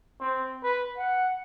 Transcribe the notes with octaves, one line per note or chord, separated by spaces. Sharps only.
C4
B4
F#5